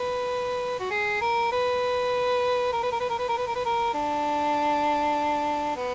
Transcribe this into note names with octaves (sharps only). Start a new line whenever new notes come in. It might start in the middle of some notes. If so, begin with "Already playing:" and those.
Already playing: B4
F#4
G#4
A#4
B4
A#4
B4
A#4
B4
A#4
B4
A#4
B4
A#4
B4
A#4
D4
B3